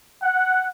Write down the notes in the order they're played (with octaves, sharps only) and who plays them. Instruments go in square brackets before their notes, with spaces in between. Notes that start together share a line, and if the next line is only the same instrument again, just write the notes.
[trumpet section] F#5